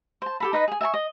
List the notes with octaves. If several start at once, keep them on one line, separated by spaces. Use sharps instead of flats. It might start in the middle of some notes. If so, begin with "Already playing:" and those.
C5 A5
G4 A4 B5
D#4 B4 D#5
G#4 G#5
E5 G#5 A5 C#6
D#5